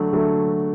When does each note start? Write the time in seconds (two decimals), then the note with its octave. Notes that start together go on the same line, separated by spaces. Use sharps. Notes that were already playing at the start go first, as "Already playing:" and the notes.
Already playing: D3 F#3 A3
0.13 D3 F#3 A3